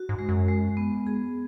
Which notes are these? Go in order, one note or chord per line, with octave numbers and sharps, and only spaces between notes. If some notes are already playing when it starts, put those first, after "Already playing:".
Already playing: F#4
G#2
G#3
F#2
G#3
B3
G#4